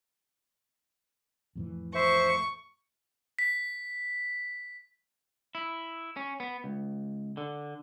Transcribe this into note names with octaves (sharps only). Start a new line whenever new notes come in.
F2 A2 E3
C5 E5 C#6
B6
E4
C#4
B3
C#2
D3